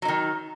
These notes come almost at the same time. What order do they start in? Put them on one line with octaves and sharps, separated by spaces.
F#3 D#4 D#3